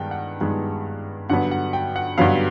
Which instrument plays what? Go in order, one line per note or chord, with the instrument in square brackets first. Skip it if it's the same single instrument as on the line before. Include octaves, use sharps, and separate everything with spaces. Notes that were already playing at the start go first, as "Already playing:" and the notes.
Already playing: [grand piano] G2 D#3 G#3 B3 G5 A5
F#5
G2 D#3 G#3 B3
G2 D3 F#3 B3 F#5
F#5
G5
F#5
G2 D3 F#3 B3 F5